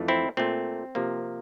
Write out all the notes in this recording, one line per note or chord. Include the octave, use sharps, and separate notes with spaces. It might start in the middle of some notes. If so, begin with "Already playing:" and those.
Already playing: F2 E3 A3
C4 E4
A#2 A3 C4
C3 F3 A#3